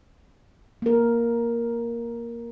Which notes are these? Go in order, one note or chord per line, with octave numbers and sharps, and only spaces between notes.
A#3 A#4